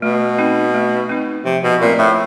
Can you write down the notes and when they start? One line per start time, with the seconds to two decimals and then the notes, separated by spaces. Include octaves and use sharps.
0.02 B2 A3
0.39 C4 D#4
0.74 A3
1.09 C4 D#4
1.45 C3 F3
1.63 B2
1.81 A#2 A3 C4 E4
1.98 A2